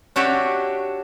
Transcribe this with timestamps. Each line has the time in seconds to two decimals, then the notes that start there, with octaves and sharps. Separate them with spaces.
0.16 D4 F#4 G4 C#5 E5